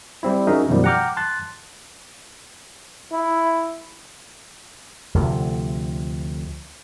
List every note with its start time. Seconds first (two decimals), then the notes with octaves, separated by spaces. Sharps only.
0.23 G3 C4 E4
0.47 C#4 D#4 F#4 G#4 A#4 E5
0.68 F#2 B2 D#3 F3 G3
0.84 F#5 G5 A#5 D6 F6 G6
1.17 A5 C6 F#6 A6
3.12 E4
5.14 D2 C3 F3